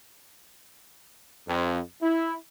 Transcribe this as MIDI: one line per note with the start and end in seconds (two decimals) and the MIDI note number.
1.48 1.81 41
2.02 2.35 64